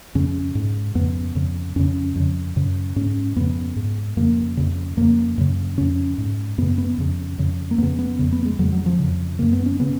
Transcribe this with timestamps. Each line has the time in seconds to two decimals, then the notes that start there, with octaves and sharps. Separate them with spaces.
0.15 F2 C#3 C#4
0.55 G#2
0.95 F2 C#3 B3
1.35 F2 C#3
1.76 F2 C#3 C#4
2.16 F2 C#3
2.56 F#2 C#3
2.96 G#2 C#4
3.36 F2 C#3 B3
3.76 G#2
4.17 F2 C#3 A#3
4.57 F2 C#3
4.97 F2 C#3 A#3
5.38 F#2 C#3
5.78 F2 C#3 C#4
6.18 G#2
6.58 F#2 C#3 B3
6.78 B3
6.98 F2 C#3
7.38 F2 C#3
7.71 A#3
7.78 F2 C#3 B3
7.99 B3
8.19 F2 C#3
8.32 B3
8.45 G#3
8.59 F2 C#3 F#3
8.72 F#3
8.86 F3
8.99 F2 C#3
9.39 F#2 C#3 A#3
9.53 B3
9.66 C#4
9.80 C#3 B3